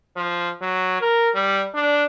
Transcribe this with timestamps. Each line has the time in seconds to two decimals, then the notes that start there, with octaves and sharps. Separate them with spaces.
0.17 F3
0.62 F#3
1.01 A#4
1.35 G3
1.74 D4